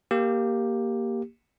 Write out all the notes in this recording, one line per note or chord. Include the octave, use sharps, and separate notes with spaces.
A#3 G4